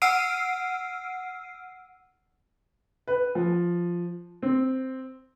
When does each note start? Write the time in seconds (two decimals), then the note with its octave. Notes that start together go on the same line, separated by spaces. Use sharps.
0.02 F#5 E6 F6 C7 D7 D#7
3.08 B4
3.35 F3
4.43 C4